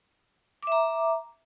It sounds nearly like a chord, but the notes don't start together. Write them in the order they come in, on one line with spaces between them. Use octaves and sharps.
D6 E5 A#5